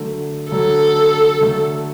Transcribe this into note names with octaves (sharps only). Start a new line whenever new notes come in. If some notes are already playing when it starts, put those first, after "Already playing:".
Already playing: D3 F#3 A3
D3 F#3 A3 A4
D3 F#3 A3